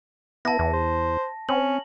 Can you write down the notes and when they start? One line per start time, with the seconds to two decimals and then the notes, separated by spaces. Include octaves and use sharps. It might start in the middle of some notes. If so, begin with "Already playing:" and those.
0.45 B3 E4 A5 A#6
0.59 E2 E3
0.73 C5
1.49 C4 C#4 F#7